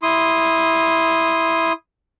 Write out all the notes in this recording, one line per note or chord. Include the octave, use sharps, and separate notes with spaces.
E4 C6 D#6